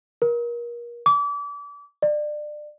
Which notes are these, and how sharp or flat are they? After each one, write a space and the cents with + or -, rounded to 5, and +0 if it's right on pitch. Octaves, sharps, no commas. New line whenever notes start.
A#4 +30
D6 -35
D5 +25